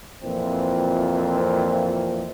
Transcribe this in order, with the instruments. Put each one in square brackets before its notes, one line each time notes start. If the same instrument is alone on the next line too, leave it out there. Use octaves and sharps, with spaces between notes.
[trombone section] F2 A#2 E3 C4